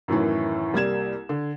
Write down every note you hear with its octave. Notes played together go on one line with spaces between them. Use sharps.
F#2 A2 D#3 E3
C2 G3 A#3 G#6 E7
D3